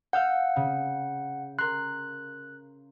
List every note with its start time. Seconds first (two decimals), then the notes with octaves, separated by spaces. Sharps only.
0.13 F5 F#5 E6 G6
0.56 C#3
1.59 A#4 C6 F#6